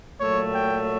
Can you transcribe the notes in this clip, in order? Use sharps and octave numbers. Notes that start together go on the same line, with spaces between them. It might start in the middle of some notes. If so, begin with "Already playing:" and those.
A#2 F#3 A3 C#5
G5